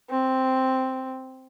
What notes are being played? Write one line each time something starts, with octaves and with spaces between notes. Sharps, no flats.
C4